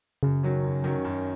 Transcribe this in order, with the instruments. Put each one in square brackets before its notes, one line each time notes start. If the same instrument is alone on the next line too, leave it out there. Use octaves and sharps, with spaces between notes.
[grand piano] F#2 [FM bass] C#3
[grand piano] D#3 F#3 C#4
F#2
D#3 F#3 C#4
F#2